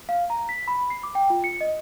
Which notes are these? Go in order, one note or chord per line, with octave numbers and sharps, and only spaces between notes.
F5
A#5
B6
B5
C7
D6
G5
F4
C#7
D#5